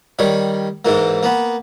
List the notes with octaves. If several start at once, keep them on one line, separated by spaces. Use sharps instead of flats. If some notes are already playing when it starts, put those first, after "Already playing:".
D#3 G3 C#5
G#2 E3 A#3
A#3 B3